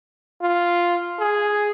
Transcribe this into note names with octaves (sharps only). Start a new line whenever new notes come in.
F4
G#4